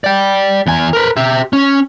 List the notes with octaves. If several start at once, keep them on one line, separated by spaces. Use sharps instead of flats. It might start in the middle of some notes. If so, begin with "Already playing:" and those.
D5 G5
E2 G#5
A#4 B4
G4 E5
C#4